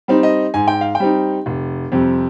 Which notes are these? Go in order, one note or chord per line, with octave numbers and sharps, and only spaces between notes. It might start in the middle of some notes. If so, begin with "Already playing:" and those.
G3 C4 D#4
D#5
G#2 G#5
G5
F5
G5
G3 C4 D#4
F1
F2 C3 G3